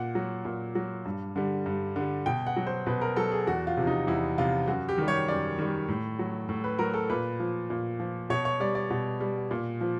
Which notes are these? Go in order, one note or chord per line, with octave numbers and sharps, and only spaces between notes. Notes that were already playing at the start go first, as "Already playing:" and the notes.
Already playing: A#2 F#5
F#3
A#2
F#3
G2
D3 G3
G2
D3 G3
B2 G5
F#5
F#3
C5
B2 B4
A#4
F#3 A4
G#4
E2 F#4
F4
C3 F3
D#4
E2 E4
C3 F3 F4
F#2 F#4
G4
D#3 G3
C#5
F#2 D5
D#3 G3
A2
F#3
A2
B4
F#3 A#4
A4
A#2 B4
F3
A#2
F3
B2 C#5
C#5
G3 D5
D5
B2
G3
A#2
F3